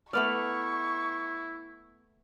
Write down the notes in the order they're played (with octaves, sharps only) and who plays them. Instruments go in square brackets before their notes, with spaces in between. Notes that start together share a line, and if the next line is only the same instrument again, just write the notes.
[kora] A3 B3 D5 [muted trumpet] E4 [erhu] C#6 [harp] F6